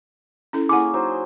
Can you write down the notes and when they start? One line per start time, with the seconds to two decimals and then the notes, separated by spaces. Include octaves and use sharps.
0.53 C#4 E4 A4
0.69 A#3 C#4 E4 G#4 F#5 D6
0.94 F#3 D#4 C5